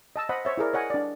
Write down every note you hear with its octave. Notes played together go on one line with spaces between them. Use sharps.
D#5 A5 E6
C5 D#5 F#5 B5
C5 C#5 E5
E4 G#4 A#4 D5
C#5 D#5 F#5 G#5
D4 D5